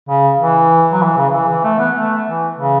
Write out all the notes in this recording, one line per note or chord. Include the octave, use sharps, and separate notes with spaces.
C#3
E3
F#3
E3
C#3
E3
E3
A3
B3
A3
E3
C#3